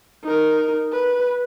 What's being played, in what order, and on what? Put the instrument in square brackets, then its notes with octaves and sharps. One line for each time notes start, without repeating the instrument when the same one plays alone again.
[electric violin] D#4 A#4
B4